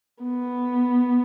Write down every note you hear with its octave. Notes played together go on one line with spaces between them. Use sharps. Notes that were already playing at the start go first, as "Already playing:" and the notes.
B3